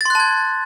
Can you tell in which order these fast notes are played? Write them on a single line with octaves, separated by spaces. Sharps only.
A6 C6 F#6 A5 G#6